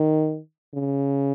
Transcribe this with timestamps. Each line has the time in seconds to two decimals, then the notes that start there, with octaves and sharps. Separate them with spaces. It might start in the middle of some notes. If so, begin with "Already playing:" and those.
Already playing: D#3
0.74 C#3